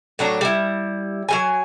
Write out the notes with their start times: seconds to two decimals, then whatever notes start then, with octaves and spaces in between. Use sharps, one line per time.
0.19 A2 F#3 D4 A#5
0.41 G3 E4
1.29 F#3 G3 G#5